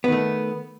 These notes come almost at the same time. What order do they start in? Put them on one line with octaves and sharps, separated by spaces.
B3 D#3 A3